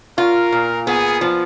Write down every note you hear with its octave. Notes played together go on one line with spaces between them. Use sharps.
F4 A#4
A#2
B3 G#4
F3